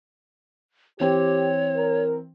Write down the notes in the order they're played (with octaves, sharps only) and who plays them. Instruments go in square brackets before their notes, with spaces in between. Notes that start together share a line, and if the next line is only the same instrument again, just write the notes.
[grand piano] E3 C4 [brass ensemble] G4 [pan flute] C#5
[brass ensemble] A#4